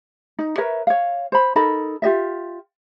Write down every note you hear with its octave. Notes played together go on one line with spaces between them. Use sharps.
D#4
A#4 B4 C#5 E5
C#5 F5
C5 B5
D#4 A4 A#4 B5
F4 G4 D#5 E5